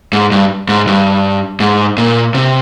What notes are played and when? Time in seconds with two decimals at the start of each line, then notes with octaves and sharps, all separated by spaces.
0.13 G#2
0.32 G2
0.68 G#2
0.87 G2
1.60 G#2
1.98 A#2
2.34 C3